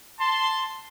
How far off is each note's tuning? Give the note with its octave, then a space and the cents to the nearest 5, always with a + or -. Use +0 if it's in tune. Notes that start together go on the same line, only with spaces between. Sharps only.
A5 +5 C6 +0